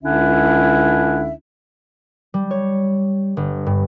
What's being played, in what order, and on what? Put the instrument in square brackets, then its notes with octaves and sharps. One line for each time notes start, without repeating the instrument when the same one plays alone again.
[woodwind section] C#2 D3 C#4 D4 E4 E5
[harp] G3
C#5
G1
G2